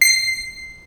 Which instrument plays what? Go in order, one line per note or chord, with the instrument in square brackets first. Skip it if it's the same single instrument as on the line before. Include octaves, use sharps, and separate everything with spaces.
[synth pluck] C7